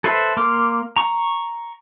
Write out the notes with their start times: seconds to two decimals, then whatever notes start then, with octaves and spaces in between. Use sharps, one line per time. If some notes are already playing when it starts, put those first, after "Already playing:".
0.04 A4 B4 C5 E5
0.37 A#3 C6 D6 F6
0.96 A#5 C#6